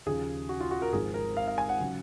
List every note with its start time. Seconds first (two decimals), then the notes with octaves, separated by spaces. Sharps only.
0.06 D#2 C#3 F3 G#4
0.49 F#4
0.60 F4
0.71 F#4
0.82 A#4
0.93 G#1 G#2 F3 G#4
1.14 A#4
1.37 F5
1.48 F5
1.58 G#5
1.69 F#5
1.79 C#3 F#3